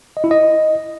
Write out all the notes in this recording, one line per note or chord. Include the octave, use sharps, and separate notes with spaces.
D#5
E4
D#5